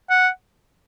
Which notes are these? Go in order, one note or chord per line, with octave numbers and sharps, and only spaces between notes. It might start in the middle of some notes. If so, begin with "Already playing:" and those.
F#5